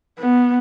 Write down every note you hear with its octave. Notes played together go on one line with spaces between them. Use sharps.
B3